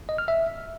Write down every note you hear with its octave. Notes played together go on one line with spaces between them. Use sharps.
D#5
F6
E5